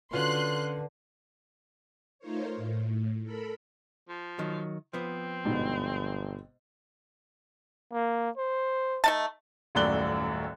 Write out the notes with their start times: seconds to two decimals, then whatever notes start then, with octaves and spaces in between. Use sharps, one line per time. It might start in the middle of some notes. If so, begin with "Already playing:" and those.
0.13 D3 C#4 F4 F#4 B4 C6 F#6
2.19 A3 D#4 F4 A#4 C5 C#5
2.56 A2
3.23 A4 A#4 B5
4.09 F3
4.39 D#3 F#3
4.93 F3 B3 C4
5.45 G1 G#2 B2
7.93 A#3
8.38 C5
9.04 A3 D#4 A5
9.75 D#1 F#2 A2 D5 F#6 G7